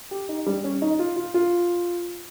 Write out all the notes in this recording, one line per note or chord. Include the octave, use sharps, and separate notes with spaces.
G4
D#4
G3
C#4
D#4
F4
F4
F4